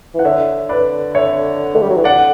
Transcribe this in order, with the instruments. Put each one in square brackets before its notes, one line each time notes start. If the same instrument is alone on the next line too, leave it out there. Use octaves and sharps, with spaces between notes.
[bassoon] E3 [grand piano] F#5
[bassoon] D3 [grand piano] C#5 E5
[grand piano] B4 D5
C#5 E5
[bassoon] A3
G3
F#3
E3
[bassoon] D3 [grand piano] D5 F#5